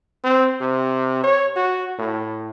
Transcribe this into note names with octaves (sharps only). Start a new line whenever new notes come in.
C4
C3
C#5
F#4
A2